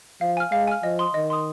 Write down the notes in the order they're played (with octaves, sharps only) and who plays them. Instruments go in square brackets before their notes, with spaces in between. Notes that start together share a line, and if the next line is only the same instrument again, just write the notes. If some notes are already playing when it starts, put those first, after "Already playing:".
[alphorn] F3 [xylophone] F5
[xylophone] G#5 F6
[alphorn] G#3 [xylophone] F5
[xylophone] G#5 F6
[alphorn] F3 [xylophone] D#5
[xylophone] C6 D#6
[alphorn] D#3 [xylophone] D#5
[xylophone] C6 D#6